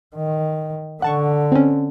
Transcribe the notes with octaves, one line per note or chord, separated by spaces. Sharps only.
D#3
D3 F#5 A5 C#6
C4 C#4